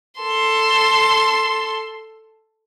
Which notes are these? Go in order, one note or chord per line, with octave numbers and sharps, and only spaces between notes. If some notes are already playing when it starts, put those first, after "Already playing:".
A4 C6